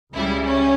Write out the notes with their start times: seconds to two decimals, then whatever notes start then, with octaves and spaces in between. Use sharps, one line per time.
0.13 C#2 C#3 G3 E4
0.46 C#4